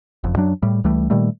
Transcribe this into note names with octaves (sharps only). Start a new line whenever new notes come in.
F#1 F2
F#2 F#3 D4
A2 G3
C#2 E3 G3 A3
A#2 D#3 G3 A3